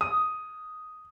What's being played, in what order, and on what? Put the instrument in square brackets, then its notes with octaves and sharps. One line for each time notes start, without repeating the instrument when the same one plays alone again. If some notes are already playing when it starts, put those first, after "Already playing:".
[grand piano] D#6